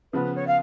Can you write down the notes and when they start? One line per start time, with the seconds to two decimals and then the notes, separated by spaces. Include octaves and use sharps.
0.12 C#3 F3 B3 B4
0.35 C#5
0.47 F5